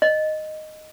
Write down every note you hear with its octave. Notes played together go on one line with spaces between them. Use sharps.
D#5